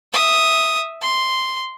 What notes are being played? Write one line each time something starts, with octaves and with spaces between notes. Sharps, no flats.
E5 D#6
C6